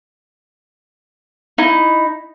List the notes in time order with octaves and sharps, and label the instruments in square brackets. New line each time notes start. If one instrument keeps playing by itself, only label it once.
[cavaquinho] D#4 E4